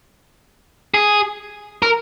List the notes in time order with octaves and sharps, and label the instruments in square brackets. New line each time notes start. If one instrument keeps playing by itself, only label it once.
[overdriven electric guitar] G#4
A#4